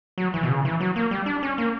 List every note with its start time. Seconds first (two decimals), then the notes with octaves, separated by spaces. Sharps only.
0.18 F#3
0.34 E3
0.43 B2
0.49 C#3
0.65 E3
0.80 F#3
0.96 A#3
1.11 G3
1.26 D4
1.43 C#4
1.58 A#3